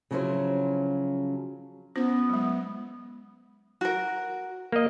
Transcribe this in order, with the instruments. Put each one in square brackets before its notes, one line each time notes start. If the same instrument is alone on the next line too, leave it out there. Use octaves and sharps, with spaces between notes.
[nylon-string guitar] C#3 F3 F#3 C#4 E4 C5
[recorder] B3 [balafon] C#4 F4 C5
[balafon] F#3 G#3
[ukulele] F#4 A#4
[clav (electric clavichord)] A#3 D#5